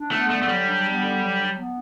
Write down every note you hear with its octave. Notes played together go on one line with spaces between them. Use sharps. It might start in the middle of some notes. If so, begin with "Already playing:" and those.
Already playing: D4
A3 B3
D3 A3
A3
F#3 G3
D4
B3
D3
F#3
D4
B3